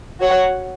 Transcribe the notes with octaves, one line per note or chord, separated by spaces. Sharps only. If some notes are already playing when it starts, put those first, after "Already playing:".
F#4 C#5 F#5